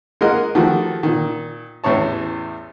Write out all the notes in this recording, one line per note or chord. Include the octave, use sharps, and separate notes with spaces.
G#3 A#3 G#4 A#4 D#5 F#5
D#3 F3 A3 F#4 G4
A#2 D#3
A1 E2 A2 E4 C#5 A5